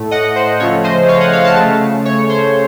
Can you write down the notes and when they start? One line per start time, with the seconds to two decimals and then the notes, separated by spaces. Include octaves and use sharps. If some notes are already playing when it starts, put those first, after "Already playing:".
Already playing: A2 A3
0.11 D#5 F#5
0.36 C5
0.60 C#3 F3 A3 C#5
0.84 C5 D#5
1.08 C#5 F5
1.20 D#5 F#5
1.32 C#5 F5
1.44 F5 A5
1.57 C#3 A3
2.05 C#5
2.29 C5